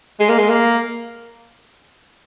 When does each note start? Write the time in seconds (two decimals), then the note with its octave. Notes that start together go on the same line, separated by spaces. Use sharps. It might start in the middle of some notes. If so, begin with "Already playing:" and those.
0.20 G#3
0.29 A#3
0.38 G#3
0.49 A#3